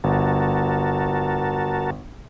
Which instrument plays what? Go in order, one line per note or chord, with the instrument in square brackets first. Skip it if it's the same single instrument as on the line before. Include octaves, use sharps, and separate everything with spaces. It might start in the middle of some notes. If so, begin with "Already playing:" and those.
[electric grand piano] G1 [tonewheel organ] F#4 A#4 A5